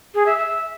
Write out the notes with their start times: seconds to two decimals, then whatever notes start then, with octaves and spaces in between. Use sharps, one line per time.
0.14 G#4
0.26 E5
0.38 E5